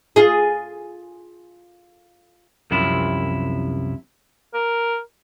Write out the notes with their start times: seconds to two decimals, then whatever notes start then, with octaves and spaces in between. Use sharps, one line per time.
0.16 F4 G#4
2.71 C2 F#2 C3 F3 E4
4.54 A#4